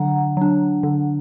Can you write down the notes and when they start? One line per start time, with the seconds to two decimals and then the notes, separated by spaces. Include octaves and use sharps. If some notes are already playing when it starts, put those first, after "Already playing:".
Already playing: D3 F#3 D4 F#5 A#5
0.37 F#3 D4
0.83 D3